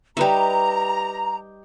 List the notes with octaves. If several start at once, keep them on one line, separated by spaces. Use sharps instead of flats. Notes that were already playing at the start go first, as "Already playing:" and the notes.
G3 D#4 G4 B4 E5 A#5